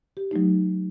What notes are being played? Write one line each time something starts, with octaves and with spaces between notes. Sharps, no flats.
G4
F#3 A3 D#4